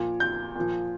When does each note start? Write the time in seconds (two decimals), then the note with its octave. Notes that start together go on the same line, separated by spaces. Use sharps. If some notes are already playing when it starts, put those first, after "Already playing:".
Already playing: A#2 F3
0.20 G6
0.56 A#2 F3